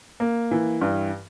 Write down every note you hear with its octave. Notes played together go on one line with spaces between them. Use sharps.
A#3
E3
G2